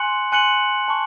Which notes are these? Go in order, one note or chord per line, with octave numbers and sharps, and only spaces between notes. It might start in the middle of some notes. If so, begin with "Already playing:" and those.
Already playing: G#5 C6 F#6 C#7 F#7
G#5 C6 F#6 C#7 F#7
A5 C#6